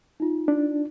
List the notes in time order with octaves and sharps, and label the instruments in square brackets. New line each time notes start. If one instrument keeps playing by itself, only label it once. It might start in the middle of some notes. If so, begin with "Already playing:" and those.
[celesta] D#4 F4
[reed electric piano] D4